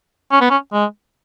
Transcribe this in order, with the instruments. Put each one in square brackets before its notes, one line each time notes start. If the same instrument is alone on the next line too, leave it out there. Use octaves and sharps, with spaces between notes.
[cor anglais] C#4
B3
C#4
G#3